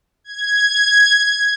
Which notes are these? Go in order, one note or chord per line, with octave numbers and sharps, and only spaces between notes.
G#6